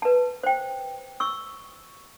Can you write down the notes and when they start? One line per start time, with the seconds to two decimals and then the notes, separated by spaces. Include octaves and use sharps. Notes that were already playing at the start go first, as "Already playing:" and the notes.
0.02 B4 A5
0.43 C5 G5
1.20 C#6 E6